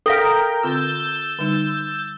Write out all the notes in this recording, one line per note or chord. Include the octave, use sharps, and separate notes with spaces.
A4 A#4 F5 G5
D3 C4 F4 E6 G6 A6
D3 G3 D#4